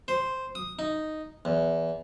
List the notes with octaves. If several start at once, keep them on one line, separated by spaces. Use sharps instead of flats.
C5
D#6
D#4
E2